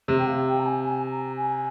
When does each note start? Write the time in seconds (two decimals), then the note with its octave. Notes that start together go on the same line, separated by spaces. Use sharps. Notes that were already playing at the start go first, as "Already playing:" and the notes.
0.08 C3
0.18 G5
0.27 F5
0.47 G5
0.59 A#5
0.65 G#5
0.85 G#5
1.11 A#5
1.36 G#5